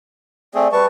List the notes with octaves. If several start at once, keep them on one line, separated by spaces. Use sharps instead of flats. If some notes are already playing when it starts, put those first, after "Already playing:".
A3 C4 G#4 D5
G3 B4 A5 C#6